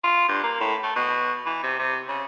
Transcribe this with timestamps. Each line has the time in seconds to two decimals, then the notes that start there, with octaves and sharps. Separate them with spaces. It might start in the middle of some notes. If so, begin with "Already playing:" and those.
0.04 F4
0.28 G2
0.43 A#3
0.60 A2
0.83 A3
0.96 B2
1.46 E3
1.63 C3
1.79 C3
2.08 C#3